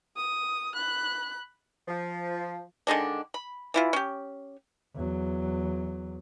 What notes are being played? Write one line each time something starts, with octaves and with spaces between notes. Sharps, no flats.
D#6
B5 F#6
F3
D3 D#3 G#3 D4
B5
E3 E4 F4
C#4 G4
E2 F#3